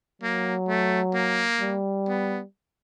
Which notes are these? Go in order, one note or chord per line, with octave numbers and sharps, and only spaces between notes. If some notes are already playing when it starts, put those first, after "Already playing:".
F#3 A#3
A3
A#3
G3
B3